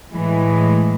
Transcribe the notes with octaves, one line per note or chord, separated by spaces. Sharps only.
A2 E3 G#3